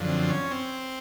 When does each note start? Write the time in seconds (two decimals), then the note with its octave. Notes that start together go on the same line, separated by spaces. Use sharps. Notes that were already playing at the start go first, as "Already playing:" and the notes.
Already playing: F#2 D3 F3
0.08 C4
0.29 C#4
0.51 C4